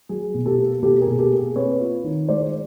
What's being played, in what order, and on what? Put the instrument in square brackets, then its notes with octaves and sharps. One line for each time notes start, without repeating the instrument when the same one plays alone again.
[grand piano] F#3 G#4
B2
G4 A4
A#3
B2 G4 A4
G#4 A#4
B2
G4 A4
A#3
G#4
C4 B4 C#5
F4
D#3
G#3 C5 D5